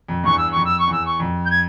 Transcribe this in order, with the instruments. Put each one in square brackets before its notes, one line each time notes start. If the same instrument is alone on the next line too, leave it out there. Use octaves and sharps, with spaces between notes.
[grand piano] F2
[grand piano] E2 G2 [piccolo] C#6
[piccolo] E6
[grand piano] F2 [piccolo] C#6
[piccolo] E6
C#6
[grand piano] E2 [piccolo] E6
[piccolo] C#6
[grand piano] F2
[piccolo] G6
G#6